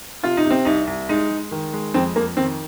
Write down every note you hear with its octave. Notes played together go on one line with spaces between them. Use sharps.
C3 F4
D#4
C3
C4
C2 D#4
C2
G#3 D#4
G#3
D#3
G#3
F2 C4
F2 A#3
D#3 C4